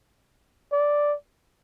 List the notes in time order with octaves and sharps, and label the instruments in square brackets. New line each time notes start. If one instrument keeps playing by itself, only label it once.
[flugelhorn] D5